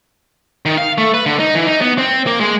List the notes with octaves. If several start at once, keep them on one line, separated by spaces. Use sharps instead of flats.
D#3
F5
A3
B4
D3
D#4
E3
D#4
B3
C4
A#3
G#3